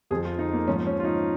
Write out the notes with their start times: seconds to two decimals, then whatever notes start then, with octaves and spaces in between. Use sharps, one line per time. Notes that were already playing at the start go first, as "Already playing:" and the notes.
0.11 F2 F3 G#4
0.25 F4
0.39 D#4
0.53 A#3
0.67 G#2 F3 C#4
0.87 C#4
1.00 F4
1.04 D#4